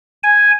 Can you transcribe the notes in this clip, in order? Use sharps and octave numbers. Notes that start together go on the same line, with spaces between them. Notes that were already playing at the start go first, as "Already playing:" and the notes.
G#5